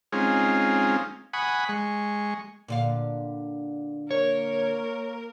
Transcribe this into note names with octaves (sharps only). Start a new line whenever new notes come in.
G#3 C4 C#4 D#4 F4 G#4
F#5 G#5 B5 C#6 D#6
G#3 C#6
A#2 D3 F5
A#3 A#4 C#5